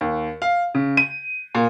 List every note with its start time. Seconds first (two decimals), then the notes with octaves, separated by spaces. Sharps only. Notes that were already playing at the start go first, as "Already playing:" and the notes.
0.01 D#2
0.42 F5
0.75 C#3
0.97 D#7
1.55 A#2